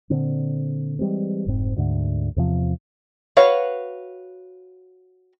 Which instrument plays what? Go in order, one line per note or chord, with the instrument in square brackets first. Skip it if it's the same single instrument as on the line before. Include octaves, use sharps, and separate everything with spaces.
[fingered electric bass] A#2 D3 C4
E3 G3 G#3 C4
F1 G#2 C4
D2 G#2 D3
E2 C3 F3
[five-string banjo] F#4 B4 C#5 F5